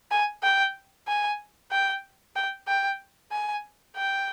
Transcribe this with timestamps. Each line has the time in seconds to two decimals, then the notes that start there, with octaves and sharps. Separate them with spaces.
0.11 G#5
0.43 G5
1.07 G#5
1.71 G5
2.36 G5
2.67 G5
3.32 G#5
3.97 G5